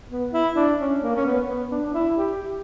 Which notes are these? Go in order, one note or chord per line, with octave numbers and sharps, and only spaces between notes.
B3
E4
D4
C#4
A#3
C#4
B3
B3
D4
D4
E4
G4
G4